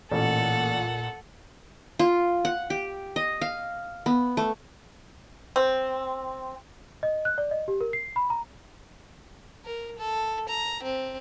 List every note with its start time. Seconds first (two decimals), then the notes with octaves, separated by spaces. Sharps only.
0.12 A1 A#2 A4 F#5
1.99 F4
2.45 F#5
2.70 G4
3.16 D#5
3.41 F5
4.06 B3
4.37 A3
5.56 C4
7.03 D#5
7.25 F#6
7.38 D5
7.51 D#5
7.68 G4
7.81 A#4
7.93 C7
8.16 B5
8.30 A#5
9.65 A#4
9.98 A4
10.48 A#5
10.83 C4